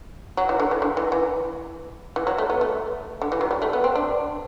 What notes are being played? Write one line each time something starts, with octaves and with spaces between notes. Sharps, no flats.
F#3
E3
D3
E3
D3
E3
E3
E3
F#3
A3
B3
A3
D3
E3
F#3
G3
A3
B3
C4
D4